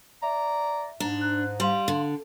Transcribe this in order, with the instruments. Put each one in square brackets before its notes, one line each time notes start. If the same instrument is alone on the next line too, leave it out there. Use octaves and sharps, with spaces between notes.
[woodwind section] D5 A#5 [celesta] E5
[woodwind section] G#2 [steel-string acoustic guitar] D4 [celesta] A#5
[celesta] F#6
[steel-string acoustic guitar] G3 [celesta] F5 C6 F#7
[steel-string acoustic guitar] D3